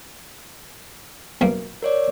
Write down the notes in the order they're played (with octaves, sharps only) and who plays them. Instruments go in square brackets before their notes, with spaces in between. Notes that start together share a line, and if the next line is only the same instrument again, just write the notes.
[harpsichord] B1 F#2 A#3
[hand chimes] A#4 C#5 D5